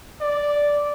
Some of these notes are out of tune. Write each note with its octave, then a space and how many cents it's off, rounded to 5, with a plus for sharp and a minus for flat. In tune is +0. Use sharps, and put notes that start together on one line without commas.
D5 -5